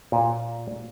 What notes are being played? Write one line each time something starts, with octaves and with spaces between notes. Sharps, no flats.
A#2